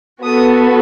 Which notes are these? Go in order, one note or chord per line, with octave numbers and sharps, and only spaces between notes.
B3 F#4 A4 D#6